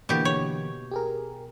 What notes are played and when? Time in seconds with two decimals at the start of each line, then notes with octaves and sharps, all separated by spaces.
0.09 B2 D3 E3 A#3 G4
0.25 C#5
0.91 G4 G#4 A#4